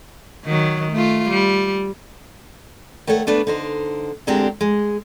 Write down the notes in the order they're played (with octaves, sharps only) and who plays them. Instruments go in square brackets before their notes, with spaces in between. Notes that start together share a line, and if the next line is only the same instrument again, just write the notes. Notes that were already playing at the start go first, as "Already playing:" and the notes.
[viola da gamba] D#3 F#3
A3 F4
G3
[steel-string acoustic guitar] D#3 A3 A4 C#5 F#5
A3 B3 D4 B4
D3 D#4 C5
D2 G#3 C4 D4 G4 A#4
G#3